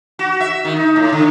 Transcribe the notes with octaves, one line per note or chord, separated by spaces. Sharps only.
F#4
E5
D#3
D#4
A2
D3